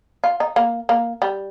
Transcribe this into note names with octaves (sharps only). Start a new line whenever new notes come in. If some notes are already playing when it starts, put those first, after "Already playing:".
F4
D#4
A#3
A#3
G3